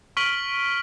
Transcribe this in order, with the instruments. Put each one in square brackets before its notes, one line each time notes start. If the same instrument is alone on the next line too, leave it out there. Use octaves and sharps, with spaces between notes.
[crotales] C#6 F6 B6 D7 F#7 G7